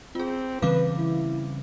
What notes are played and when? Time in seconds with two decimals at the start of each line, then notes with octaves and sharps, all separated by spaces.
0.15 C4 F4 G#4
0.62 C#3 E3 G3 C4 B4 F5 D6
0.98 E4